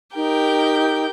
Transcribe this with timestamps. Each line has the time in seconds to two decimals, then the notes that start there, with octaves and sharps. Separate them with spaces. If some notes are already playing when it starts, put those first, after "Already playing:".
0.16 D#4 G4 A#4 G5